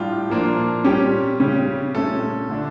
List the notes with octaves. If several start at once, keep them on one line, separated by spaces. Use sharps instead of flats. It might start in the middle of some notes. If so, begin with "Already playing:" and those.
Already playing: A2 G3 D4 F4
A#2 F3 A#3 D4
A#2 G3 C#4 G4
C#3 G3 C#4
A#2 A3 C#4 A4
D3 A3 D4